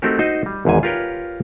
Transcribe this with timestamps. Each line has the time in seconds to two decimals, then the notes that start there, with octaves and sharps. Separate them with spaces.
0.02 A3 C4 D#4 F#4 G4 A#4
0.19 D#4 F#4 C5 D#5
0.46 G3
0.65 G#1 E2 G#2 G#5
0.83 F4 G4 A#4 B4 C#5 G5